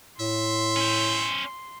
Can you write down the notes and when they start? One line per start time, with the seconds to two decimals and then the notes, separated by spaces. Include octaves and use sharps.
0.20 A2 E5 C6
0.76 C#4 C5